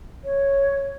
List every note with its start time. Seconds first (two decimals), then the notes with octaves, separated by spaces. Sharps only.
0.25 C#5